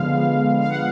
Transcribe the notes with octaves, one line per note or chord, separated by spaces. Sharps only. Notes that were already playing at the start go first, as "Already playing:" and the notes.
Already playing: D3 F3 G#3 B3 F5
F5
F#5